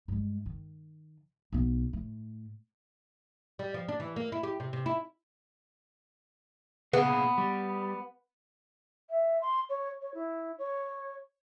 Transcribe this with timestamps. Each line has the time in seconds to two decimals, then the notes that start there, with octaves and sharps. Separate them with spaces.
0.08 G2 G#3
0.46 D#3
1.53 B1 B3
1.93 A2
3.59 G3
3.74 F3
3.88 D4
4.00 E3
4.16 A#3
4.32 E4
4.43 G4
4.60 C3
4.73 C3
4.86 E4
6.93 A#2 C#3 B3 G#4 B4 F5
7.38 G3
9.10 E5
9.42 C6
9.70 C#5
10.01 C#5
10.14 E4
10.59 C#5